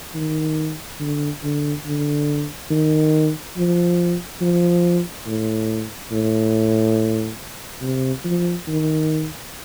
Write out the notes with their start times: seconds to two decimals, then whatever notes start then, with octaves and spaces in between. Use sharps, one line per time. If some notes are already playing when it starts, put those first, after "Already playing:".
0.15 D#3
1.00 D3
1.43 D3
1.86 D3
2.70 D#3
3.57 F3
4.41 F3
5.27 A2
6.11 A2
7.82 C3
8.24 F3
8.68 D#3